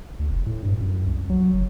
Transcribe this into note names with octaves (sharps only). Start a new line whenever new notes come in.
D2
F1
A2
G2
F#2
C2
F#3
F#1